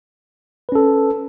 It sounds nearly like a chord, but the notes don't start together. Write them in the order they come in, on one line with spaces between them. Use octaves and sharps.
B4 C#4 A4